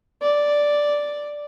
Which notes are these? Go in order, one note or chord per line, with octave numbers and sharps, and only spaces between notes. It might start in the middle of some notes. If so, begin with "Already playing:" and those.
D5